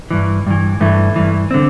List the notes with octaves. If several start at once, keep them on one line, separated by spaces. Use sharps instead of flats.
G2 E3
G2 E3
G2 E3 A3
G2 E3
D3 C4